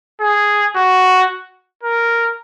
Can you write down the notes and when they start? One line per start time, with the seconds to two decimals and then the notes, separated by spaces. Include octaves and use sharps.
0.21 G#4
0.76 F#4
1.83 A#4